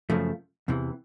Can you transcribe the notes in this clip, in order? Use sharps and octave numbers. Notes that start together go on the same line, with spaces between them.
F#2 C#3 F3 A3
E2 C3 E3